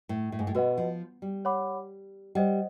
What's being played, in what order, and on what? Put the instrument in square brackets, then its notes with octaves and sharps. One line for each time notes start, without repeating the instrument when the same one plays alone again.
[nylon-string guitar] A2
A2
G#2
A2
[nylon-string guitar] B2 [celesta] F#4 B4 D#5 F#5
[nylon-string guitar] F3
G3
[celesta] C#5 F#5 B5 D6
[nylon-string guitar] G3 [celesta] C5 D#5 F#5